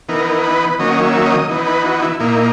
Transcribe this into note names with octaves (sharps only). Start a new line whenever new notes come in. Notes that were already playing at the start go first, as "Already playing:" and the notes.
E3 B3 D#4 A#4
B4
D#3 F#3 A#3 C#4 D#5
E5
D#5
E3 B3 D#4
B4
F#4
E4
A#2 A#3 D#4 E4